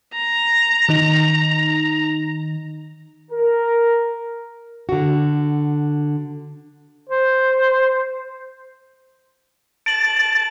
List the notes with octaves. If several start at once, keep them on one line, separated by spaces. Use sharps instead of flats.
A#5
D#3 D#4
A#4
D3 F#4
C5
A5 D7 F#7